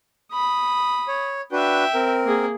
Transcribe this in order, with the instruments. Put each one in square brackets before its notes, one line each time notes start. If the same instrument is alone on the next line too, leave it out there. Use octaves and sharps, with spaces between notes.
[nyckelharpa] B5 D#6
[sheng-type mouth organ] C#5
[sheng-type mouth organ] D4 F#4 B4 [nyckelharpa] E5 G5
[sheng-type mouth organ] C4 A#4
[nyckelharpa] A#3 G#4